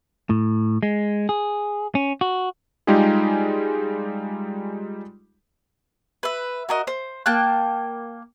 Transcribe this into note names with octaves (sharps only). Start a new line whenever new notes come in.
A2
G#3
G#4
C#4
F#4
G3 G#3 D#4 F4 G4 G#4
B4 E5
F#4 A#4 D#5
C5
A#3 G5 A5 F#6